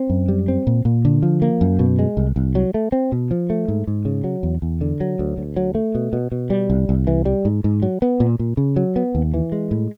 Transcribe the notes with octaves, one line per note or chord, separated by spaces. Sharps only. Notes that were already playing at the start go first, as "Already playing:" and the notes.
Already playing: C4
F#2
G3
C4
A#2
A#2
D3
F3
A#3
F#2
B2
G#3
C2
C2
F#3
A3
C4
B2
F3
A3
G#2
G#2
C#3
F#3
E2
E2
D3
F#3
D2
D2
F#3
A3
B2
B2
B2
G3
C2
C2
E3
G3
G#2
G#2
F#3
B3
A#2
A#2
C#3
F#3
B3
D#2
E3
G#3
A2